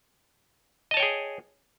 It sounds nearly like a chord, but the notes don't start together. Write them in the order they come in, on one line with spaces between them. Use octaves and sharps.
D#5 A5 C#5 G5 G#4